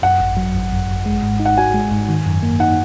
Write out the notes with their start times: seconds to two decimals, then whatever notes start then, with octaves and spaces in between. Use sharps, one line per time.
0.02 F#2 F#5
0.20 G#1
0.37 F#3
0.55 G#1
0.72 F#2
0.89 G#1
1.06 G#3
1.23 G#2
1.40 D#4
1.45 F#5
1.57 F#4 G#5
1.74 G#3
1.91 G#2
2.09 D#3
2.26 F#2
2.43 A#3
2.60 D#4 F#5